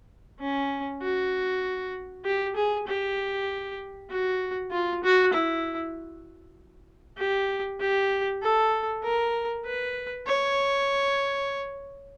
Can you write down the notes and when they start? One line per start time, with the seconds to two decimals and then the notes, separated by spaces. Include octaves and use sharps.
0.40 C#4
1.02 F#4
2.25 G4
2.56 G#4
2.88 G4
4.10 F#4
4.71 F4
5.03 F#4
5.33 E4
7.18 G4
7.80 G4
8.42 A4
9.04 A#4
9.66 B4
10.27 C#5